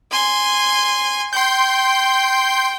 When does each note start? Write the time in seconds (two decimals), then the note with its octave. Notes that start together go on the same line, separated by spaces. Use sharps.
0.11 G#5 C6
1.33 G5 C6 G6